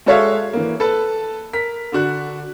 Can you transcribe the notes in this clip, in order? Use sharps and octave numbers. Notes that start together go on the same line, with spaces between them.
G#3 F#4 A4 C#5 E5 F5
E3 A#3
A4 B4 A5
A#4 B6
D3 D4 F#4 F#6